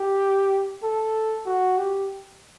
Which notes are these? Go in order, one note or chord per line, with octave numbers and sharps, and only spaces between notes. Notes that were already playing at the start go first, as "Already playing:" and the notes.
Already playing: G4
A4
F#4
G4